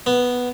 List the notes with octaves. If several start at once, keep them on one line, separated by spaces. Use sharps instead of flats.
B3